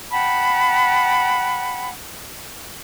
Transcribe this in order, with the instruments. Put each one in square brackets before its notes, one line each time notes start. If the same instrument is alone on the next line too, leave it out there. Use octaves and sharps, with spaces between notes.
[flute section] F#5 G5 A5 B5